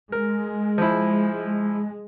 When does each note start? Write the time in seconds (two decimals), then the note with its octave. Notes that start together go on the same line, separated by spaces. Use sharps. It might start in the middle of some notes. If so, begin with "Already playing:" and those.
0.12 G#3 A#4
0.78 F3 E4